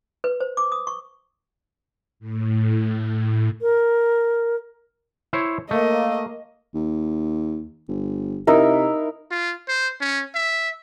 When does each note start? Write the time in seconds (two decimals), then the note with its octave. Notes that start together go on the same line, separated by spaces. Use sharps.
0.24 B4
0.40 C5
0.57 D6
0.72 D#6
0.87 C#6
2.20 A2
3.62 A#4
5.33 E4 C5 C#5
5.71 A3 A#3 D#5
6.74 D#2
7.89 G1
8.47 C3 D#4 E4 A#4
9.31 F4
9.68 C5
10.01 C#4
10.35 E5